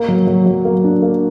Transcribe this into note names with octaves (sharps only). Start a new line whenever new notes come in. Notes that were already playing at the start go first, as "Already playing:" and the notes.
Already playing: A#3
F#3
F#3
F#3
A#3
D4
A#3